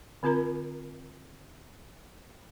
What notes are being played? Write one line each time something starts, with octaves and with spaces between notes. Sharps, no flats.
D3 C4 F4 A#4 A#5